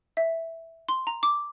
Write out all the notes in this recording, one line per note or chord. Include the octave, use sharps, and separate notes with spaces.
E5
C6
A#5
D6